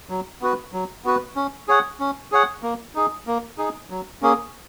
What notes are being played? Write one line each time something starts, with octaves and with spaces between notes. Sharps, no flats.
F#3
B3 F#4 B4
F#3
B3 F#4 B4
C#4
G#4 C#5 F#5
C#4
G#4 C#5 F#5
A#3
D#4 G#4
A#3
D#4 G#4
F#3
A#3 C#4 G#4